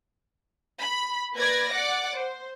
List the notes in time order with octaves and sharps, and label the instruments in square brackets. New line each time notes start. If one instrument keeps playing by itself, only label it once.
[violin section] B5
A#3 B4 D5 G#6 A#6
D5 F#5 D6
C5